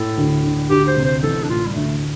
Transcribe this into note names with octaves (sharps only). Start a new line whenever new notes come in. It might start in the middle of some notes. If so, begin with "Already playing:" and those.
Already playing: A2 A4
D2
D3
D2 G4
C5
C3
C5
A1 A4
D4
A2 F4
G3
D2 A3